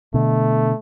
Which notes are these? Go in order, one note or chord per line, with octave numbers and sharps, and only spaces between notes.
B2 D3 A3